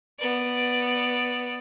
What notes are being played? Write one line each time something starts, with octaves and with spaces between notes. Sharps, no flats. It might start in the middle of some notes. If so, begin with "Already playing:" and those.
B3 D5